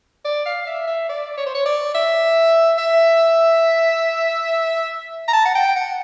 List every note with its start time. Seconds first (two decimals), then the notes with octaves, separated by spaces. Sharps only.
0.25 D5
0.46 F5
0.67 E5
0.87 E5
1.09 D5
1.37 C#5
1.46 C5
1.55 C#5
1.66 D5
1.94 E5
2.78 E5
5.28 A#5
5.33 A5
5.45 F#5
5.55 G5
5.76 F#5